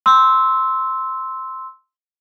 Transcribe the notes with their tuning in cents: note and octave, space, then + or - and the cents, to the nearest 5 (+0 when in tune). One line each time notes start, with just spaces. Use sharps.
C6 +0 E6 -15